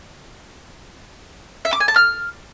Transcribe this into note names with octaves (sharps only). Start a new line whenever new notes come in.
E5
D6
G#5
A5
F6